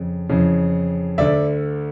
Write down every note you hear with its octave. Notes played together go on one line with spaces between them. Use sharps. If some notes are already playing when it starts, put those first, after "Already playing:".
Already playing: F2 C#3
F2 C#3 E3
D2 D3 D5 E5